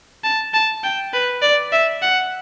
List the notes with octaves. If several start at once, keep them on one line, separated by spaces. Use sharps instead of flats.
A5
A5
G5
B4
D5
E5
F#5